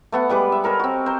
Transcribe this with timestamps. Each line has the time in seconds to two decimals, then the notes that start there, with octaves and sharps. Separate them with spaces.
0.12 A3 B3 F#5
0.29 G3 G#3 B4 D6
0.52 E5
0.64 A4 A#4 C#5 D#5
0.80 C4 F#4
1.06 C5 A#5